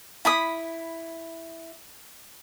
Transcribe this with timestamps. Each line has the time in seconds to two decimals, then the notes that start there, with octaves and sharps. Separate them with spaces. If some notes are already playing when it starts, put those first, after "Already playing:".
0.25 E4 B5 D#6